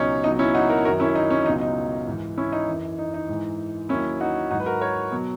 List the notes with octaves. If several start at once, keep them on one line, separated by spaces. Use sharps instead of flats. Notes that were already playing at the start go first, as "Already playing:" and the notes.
Already playing: C#2 B2 F#3 C#4 D#4
C#2 B2 F#3 D#4
C#4 E4
D#4 F#4
F#4 A#4
F#2 D#3 F#3 F#4 A#4
C#4 E4
D#4
C#4
C#2 B2 F#3 D#4
D#4
G#2 E3
C#4 E4
D#4
F#2 E3
D#4
D#4
G#2 E3
D#2 D#3 F#3 C#4 E4
D#4 F#4
G#2 F#3 D#4 F#4
B4
F#4 A#4
A#4 C#5
B2 F#3